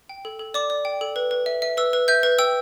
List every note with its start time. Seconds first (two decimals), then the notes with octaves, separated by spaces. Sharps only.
0.09 G5
0.25 A4
0.39 A4
0.54 D5 D6
0.70 D5
0.85 G5
1.01 A4
1.16 B4
1.31 B4
1.46 E5
1.62 E5
1.77 B4 E6
1.93 B4
2.08 E5 G6
2.23 B4
2.38 G5 E6